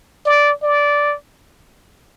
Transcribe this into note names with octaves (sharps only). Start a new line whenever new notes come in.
D5
D5